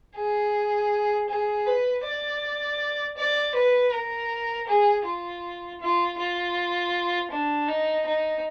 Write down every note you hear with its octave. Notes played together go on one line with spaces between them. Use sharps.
G#4
G#4
B4
D5
D5
B4
A#4
G#4
F4
F4
F4
D4
D#4
D#4